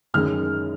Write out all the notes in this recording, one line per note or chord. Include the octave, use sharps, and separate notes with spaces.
F#2 D#3 G#3 F6